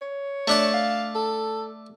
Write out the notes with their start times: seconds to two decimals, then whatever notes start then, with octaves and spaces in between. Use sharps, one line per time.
0.01 C#5
0.48 A3 D4 A5
0.74 F5
1.15 A4